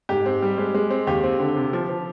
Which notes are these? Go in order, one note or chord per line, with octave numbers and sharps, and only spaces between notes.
G#2 G4
C4
G3
G#3
G#3
C4
D#2 G4
C4
D3
C3
F3
F3